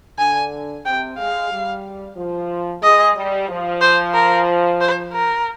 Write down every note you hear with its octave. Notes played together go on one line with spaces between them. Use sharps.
D3 G#5
C3 G5
G#3 F5
G3
F3
G#3 D#5
G3
F3
C5
A#4
C5
A#4